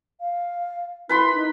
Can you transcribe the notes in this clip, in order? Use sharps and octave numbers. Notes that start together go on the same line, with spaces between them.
F5
E4 B4 B5 C6
D#4